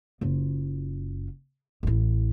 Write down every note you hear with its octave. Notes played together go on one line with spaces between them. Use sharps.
F#1 F4
A1 E4